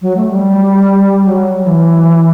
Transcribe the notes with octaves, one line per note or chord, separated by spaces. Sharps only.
F#3
A3
G3
F#3
E3